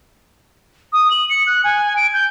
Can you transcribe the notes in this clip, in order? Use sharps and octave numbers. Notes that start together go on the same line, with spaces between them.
D#6
F#7
C#7
F#6
G#5
D7
G6